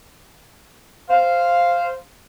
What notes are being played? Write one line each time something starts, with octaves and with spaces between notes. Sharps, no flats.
C5 F5